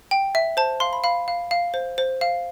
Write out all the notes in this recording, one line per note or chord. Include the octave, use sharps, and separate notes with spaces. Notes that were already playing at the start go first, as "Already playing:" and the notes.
G5
E5
C5 A5
F5 C6
B5
F5 B5
F5
F5
C5
C5
F5